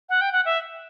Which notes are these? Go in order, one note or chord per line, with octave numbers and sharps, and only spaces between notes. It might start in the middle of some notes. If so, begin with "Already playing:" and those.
F#5
G5
F#5
E5